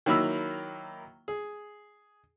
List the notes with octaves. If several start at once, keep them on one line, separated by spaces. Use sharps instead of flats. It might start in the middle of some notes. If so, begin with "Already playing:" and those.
D#3 F#3 A#3 E4 B5 E6
G#4